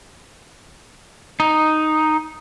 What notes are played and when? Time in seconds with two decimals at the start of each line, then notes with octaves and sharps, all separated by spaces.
1.40 D#4